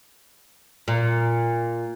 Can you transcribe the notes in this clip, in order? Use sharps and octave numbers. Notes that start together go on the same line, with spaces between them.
A#2